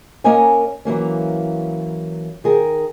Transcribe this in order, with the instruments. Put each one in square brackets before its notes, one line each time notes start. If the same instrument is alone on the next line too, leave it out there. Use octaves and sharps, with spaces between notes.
[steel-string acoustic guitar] A#3 C#4 A#4 C#5 D#5 G#5
E3 F#3 A#3 C#4
D#3 G#4 A#4